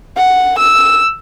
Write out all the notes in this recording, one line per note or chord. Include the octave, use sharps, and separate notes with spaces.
F#5
E6